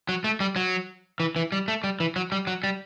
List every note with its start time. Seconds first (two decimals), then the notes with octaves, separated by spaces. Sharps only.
0.09 F#3
0.24 A3
0.40 G3
0.56 F#3
1.20 E3
1.36 E3
1.52 G3
1.68 A3
1.84 G3
2.00 E3
2.16 F#3
2.32 G3
2.47 F#3
2.64 G3